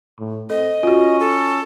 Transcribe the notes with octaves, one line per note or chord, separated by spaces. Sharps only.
A2
C4 A4 D#5
C#4 F4 F#4
A4